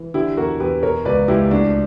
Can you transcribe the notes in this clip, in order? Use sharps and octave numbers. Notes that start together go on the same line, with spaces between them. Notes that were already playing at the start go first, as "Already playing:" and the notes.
Already playing: E3
D3 E4 G4
E2 F#4 A#4
E2 G4 B4
B2 A#4 C#5
C#2 B4 D5
C#2 E4 G4
D2 D4 F#4